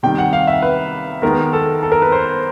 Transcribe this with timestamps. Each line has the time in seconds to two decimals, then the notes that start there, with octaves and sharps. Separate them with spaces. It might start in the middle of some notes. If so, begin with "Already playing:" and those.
0.03 C3 D#3 G3 G5
0.18 F#5
0.33 F5
0.47 E5
0.62 B4
1.22 D#3 G#3 B3 A#4
1.53 A4
1.83 A4
1.92 A#4
2.02 B4
2.12 C5